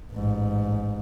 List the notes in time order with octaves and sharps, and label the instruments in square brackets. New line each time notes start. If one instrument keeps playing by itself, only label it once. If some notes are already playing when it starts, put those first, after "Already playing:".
[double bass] A1 G#2